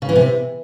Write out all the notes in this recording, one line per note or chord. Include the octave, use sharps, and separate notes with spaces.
C#3
E3
C3